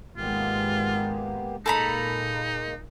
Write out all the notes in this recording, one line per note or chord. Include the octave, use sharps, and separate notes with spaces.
G#1 G#3 A#3 B3 F4 G4
A#2 G#3 A#3 D#4 A4 A#5 B5